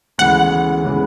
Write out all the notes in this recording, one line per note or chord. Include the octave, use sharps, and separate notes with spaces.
D2 C#3 E3 G#3 B3 F#5
C#3 E3 G#3 B3